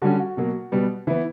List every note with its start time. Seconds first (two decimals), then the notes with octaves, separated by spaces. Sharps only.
0.02 D3 G3 C#4 F#4
0.19 F#4
0.37 B2 F#3 A#3
0.72 B2 G3 B3
1.07 E3 B3 E4